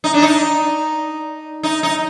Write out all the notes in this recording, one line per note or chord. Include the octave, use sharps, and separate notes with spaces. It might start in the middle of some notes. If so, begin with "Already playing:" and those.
D#4
D4
D#4
D#4
D#4